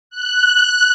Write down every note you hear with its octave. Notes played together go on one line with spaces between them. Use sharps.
F#6